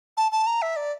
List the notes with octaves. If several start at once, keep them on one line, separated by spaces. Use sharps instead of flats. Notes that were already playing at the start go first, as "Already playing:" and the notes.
A5
A5
A#5
E5
D5